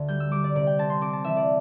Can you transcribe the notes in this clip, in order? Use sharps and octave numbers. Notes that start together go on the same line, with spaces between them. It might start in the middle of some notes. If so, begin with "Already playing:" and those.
Already playing: D2 D3
G3 G6
E6
G3 D6
D5
C3 D5
G5
C4 A5
C6
C4 D6
A5
E3 E5
D5